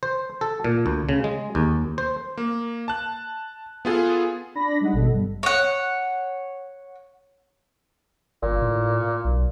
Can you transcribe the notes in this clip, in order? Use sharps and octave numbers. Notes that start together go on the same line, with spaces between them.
C5
A4
A#2
D2
C#3
G#3
D#2
C5
A#3
A5 F#6
B3 F4 G#4 A4
D4 B5 A#6
G3 G#3 D#4 D#5 F#5
G#1 B2 A4
G2 G3
C#5 F#5
G1 A#2
A2
B1